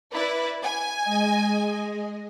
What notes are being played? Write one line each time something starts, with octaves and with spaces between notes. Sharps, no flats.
E4 B4 D5
G#5
G#3 D#5